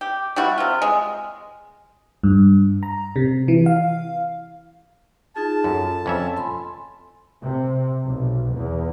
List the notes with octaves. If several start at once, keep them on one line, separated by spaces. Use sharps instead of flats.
G4
G3 E4 F#4
C3 F4
G#3
G2
A#5
C3
E3
F5
D#4 F4 G#4 A5
F#2 A4
F2 C#4 E5
G#5 B5 C6
C3
B1
E2